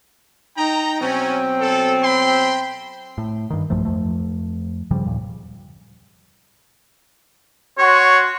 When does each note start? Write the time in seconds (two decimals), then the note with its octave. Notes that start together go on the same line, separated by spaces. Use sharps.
0.57 D#4 G5 A#5
1.01 B2 F#3 C4 C#4
1.60 A4
2.03 G5 B5 C6
3.18 A2
3.50 G2 D#3
3.70 B1 G2 F3 A3
3.85 F2 F3 A3
4.91 G2 C#3 F3 G3
5.06 D#2 A#2
7.78 F#4 C#5 C6